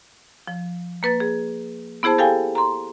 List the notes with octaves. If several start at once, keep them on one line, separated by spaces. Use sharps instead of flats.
F3
A#3 B4 A6
G#4
B3 E4 G#4 C5 A5
G4 A4 F5 G5 G#5
A#5 C6